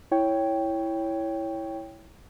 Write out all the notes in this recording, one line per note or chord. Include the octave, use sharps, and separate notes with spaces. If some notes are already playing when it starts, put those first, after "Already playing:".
E4 C#5 G5